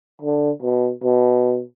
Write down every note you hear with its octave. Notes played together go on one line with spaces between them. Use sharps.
D3
B2
B2